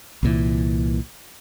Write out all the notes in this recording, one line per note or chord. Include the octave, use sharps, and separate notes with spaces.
C2 A#2 E3